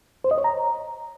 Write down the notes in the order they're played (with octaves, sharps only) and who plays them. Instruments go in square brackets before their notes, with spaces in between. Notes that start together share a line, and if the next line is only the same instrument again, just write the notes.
[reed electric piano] C5
D#5
C#5
A#5